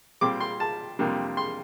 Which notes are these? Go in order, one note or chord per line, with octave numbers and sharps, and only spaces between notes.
A#2 G3 C4 D6
C6
A5
F2 C3 G3 A#3 D4
C6